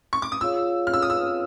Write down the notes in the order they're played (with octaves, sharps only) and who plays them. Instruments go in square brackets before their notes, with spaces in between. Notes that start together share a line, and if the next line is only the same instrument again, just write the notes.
[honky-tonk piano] C#6
D6
D#6
[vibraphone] F4 G#4 C#5 F5 [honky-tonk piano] E6
[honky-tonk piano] F6
E6
D#6
E6